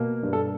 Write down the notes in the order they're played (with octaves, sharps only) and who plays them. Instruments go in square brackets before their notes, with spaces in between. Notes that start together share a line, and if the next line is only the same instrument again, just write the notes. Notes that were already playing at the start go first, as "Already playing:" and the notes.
Already playing: [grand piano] B2 A#3
G2
A4